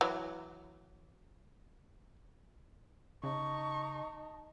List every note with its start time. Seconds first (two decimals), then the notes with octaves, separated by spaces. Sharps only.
0.01 E3 F#3
3.23 C#3 D#4 A5 C#6